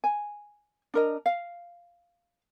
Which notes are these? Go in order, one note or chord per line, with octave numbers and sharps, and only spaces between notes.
G#5
D4 A#4 D#5
F5